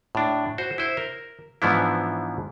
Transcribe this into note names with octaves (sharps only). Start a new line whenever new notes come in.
A2 D4
F#4 C5
E4 C5
A#4
G#2 E3 F3 B3 D4 E4